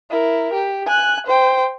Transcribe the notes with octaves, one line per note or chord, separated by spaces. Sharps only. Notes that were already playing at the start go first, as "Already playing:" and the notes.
E4 A#4
G4
G#5 F#6
C5 G5